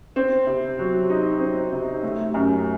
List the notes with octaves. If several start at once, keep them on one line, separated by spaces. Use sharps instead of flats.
C4
C3
F#3
D#4
C4
C3
A3
F#2